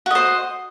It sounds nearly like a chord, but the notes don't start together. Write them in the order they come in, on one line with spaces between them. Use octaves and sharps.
F#4 D#5 C5